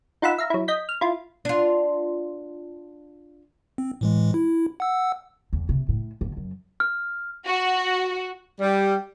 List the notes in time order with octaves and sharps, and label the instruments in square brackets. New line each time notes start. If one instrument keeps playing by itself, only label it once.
[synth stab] D#4 F4 F#5 B5 E6
E5 F5 A#5
F#3 E4
D#5 G6 B6
F6
E4 F4
[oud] D4 F4
[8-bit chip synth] C4
A2 E3 G#3
E4
F#5 E6
[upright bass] E2
C3
A2
G1
F#2
[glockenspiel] F6
[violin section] F#4
[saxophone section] G3